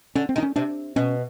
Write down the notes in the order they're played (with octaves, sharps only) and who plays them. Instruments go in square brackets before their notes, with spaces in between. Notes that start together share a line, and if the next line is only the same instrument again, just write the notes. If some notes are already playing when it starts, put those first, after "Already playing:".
[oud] D3 [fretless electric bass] C#4
[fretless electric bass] C4
[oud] D#3 [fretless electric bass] D4
[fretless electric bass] C#4
[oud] C3 [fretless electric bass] D4
[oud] B2 [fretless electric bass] C#4